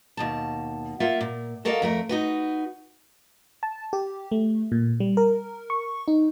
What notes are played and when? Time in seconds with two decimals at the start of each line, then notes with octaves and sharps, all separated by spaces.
0.17 D#2 B2 A5
1.00 A#3 F4 E5 F#5
1.21 A#2
1.65 F#4 A4 A#4 D5 D#5 F5
1.82 F2 A3 A#4
2.09 D#4 F#4 B4
3.63 A5
3.93 G4
4.31 A3
4.72 A#2
5.00 G3
5.17 A#4
5.70 C#6
6.08 D#4